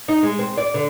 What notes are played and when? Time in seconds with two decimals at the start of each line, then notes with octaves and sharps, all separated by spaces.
0.08 D#4
0.23 G#3
0.39 C4
0.57 D5
0.74 D3